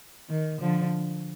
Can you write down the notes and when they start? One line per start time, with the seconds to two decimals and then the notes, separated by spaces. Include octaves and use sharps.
0.30 D#3
0.61 D3 F3